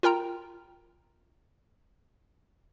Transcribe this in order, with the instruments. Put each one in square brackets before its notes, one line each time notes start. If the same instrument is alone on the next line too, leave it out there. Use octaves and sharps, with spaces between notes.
[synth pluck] F4 A#4 G5 A#5